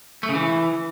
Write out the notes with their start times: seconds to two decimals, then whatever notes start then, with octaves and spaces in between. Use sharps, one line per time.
0.23 A3
0.29 C#3
0.35 E3